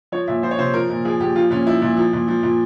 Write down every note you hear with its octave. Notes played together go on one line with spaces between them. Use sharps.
F3 C#5
A#2 E5
F3 C5
C#5
C3 C5
F3 A#4
A#2
F3 G#4
A#2 G4
F3 F4
A#2 C#4
F3 E4
A#2
F3
A#2
F3
A#2